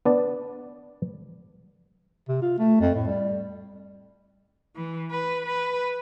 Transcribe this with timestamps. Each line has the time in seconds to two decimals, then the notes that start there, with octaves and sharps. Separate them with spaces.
0.05 B3 D4 D5
2.29 C3
2.42 F4
2.59 A3
2.81 F2
2.96 A2
3.07 G3
4.76 E3
5.11 B4
5.46 B4